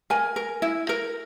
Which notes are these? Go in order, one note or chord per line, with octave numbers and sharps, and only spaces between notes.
A#4 G#5
A#4
E4
A#4